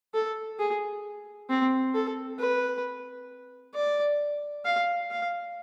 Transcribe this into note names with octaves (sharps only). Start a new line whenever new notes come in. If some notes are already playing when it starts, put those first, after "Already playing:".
A4
G#4
C4
A4
B4
D5
F5
F5